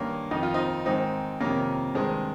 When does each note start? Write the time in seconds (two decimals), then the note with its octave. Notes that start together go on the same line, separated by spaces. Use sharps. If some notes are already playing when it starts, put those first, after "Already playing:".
Already playing: G2 D#3 A#3 C#4
0.31 F2 D#3 D#4
0.43 F4
0.54 C4 D#4
0.86 G#2 D#3 C4 D#4
1.40 F2 C3 D#3 A#3 C#4
1.95 G2 D#3 G#3 C4